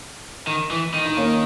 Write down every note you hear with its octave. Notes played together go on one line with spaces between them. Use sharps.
D#3
E3
D#3
D#4
A#3 C#4